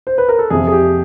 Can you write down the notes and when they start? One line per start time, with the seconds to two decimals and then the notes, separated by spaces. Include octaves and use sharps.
0.07 C5
0.18 B4
0.29 A#4
0.39 A4
0.50 F2 C3 F3 G#4
0.67 G#4
0.73 G4